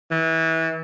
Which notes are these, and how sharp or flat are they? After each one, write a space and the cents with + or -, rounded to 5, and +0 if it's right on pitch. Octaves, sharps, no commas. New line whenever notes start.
E3 -25